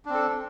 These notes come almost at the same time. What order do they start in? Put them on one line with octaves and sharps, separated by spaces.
D4 C4 A4